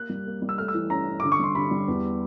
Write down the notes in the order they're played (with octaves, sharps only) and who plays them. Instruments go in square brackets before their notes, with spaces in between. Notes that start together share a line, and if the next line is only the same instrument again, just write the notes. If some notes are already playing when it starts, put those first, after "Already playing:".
Already playing: [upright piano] A#3 F#6
G3
A#3
G3
E6
A3 F6
E6
E3
C#4 A#5
C#4
D3 D6
C#6
G3 C6
D3 B5
G3
E2